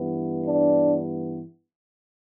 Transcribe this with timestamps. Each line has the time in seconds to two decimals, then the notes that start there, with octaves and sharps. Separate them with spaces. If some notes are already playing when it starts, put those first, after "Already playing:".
Already playing: G2 E3 B3
0.47 D4